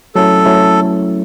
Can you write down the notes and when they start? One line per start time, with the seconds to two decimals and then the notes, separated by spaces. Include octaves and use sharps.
0.15 F#3 A3 C#4 E4 A4
0.46 F#3 A3 C#4 E4